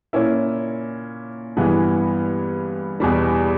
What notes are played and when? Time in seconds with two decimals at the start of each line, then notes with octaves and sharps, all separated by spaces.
0.13 A#2 A#3 C#4 E4
1.57 G2 E3 G#3 B3
3.00 E2 B2 G3